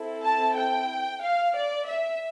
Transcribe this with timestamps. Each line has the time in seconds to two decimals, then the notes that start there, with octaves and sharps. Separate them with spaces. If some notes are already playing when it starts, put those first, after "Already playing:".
Already playing: C4 E4 A4
0.23 A5
0.56 G5
1.22 F5
1.55 D5
1.88 E5